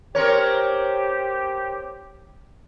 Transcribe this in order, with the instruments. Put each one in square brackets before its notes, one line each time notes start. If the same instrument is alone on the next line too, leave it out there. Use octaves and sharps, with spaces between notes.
[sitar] C4 A#4 C#5 [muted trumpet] G4